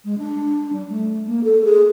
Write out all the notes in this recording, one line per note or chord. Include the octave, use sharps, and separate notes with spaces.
G#3
D4
G3
A3
A#3
A4
G#4